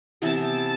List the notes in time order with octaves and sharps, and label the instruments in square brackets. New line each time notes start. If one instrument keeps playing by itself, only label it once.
[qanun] C3 E3 B3 E4 [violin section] A5